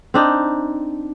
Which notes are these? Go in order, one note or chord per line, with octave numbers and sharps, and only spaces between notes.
C4 D4 D#4